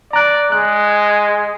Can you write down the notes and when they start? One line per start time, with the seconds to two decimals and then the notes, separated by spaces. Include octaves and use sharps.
0.13 D5 A#5 F#6
0.52 G#3 F#6